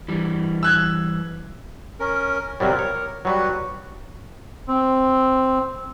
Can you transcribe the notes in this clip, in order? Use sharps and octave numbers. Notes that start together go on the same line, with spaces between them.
E3 G3
E6 F#6 G#6
C#4 A#4
C3 F#3 G3 A#4
C#5
F#3 G3 F#4 B4
C4